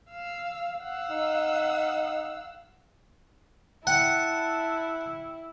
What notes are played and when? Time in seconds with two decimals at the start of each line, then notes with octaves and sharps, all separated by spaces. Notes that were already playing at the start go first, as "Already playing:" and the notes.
0.10 F5 E6
0.79 F5 F#5 E6
1.10 D#4
3.87 E4 F#5 G5 A5 C#7